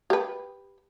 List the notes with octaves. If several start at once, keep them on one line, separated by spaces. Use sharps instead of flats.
G4 B4